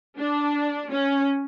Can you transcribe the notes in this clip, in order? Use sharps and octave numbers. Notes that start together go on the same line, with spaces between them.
D4
C#4